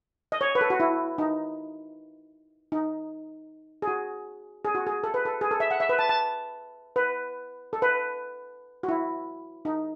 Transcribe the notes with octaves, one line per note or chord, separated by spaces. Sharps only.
D#5
C#5
B4
A4
F#4
E4
D#4
D#4
G#4
F#4
G#4
F#4
G#4
A4
B4
A4
G#4
A4
E5
F#5
E5
B4
A5
A5
B4
A4
B4
F#4
E4
D#4